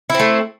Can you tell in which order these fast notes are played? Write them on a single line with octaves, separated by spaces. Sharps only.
E4 C4 A3